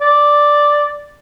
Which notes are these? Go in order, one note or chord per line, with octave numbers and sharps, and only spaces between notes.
D5